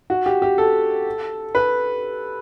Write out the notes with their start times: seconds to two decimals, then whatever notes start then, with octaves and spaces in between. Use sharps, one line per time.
0.10 F#4
0.26 G4
0.42 G4
0.58 A4
1.55 B4